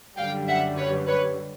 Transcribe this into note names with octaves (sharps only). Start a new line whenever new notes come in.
F#2 D3 G3 F5 G5
E5 F#5
B4 C#5
B4 C#5